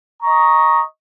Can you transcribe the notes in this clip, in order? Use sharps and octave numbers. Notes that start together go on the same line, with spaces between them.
D#5 A#5 C#6